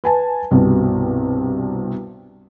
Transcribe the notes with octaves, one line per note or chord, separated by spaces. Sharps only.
B4 G#5 A5
C2 G2 B2